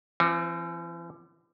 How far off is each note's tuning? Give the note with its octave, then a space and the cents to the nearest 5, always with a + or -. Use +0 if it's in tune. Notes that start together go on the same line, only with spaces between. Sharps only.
E3 +45 C4 +10